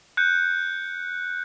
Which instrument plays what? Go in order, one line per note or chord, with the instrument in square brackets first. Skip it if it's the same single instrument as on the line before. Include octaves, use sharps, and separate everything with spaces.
[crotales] F#6 G6 C#7